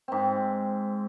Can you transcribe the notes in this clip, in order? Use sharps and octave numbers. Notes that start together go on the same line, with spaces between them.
G#2 C4